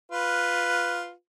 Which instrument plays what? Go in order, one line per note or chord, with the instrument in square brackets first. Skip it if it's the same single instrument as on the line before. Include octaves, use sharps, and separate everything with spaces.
[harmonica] F4 B4